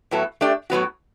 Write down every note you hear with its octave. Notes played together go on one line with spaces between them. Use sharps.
A2 F#3 B3 E4 A4
A3 D4 G4 D5
A2 F#3 B3 F#4